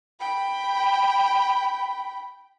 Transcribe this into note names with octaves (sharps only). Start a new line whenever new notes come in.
G5 B5